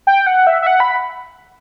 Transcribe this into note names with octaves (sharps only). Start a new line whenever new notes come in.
G5
F#5
E5
E5
F#5
B5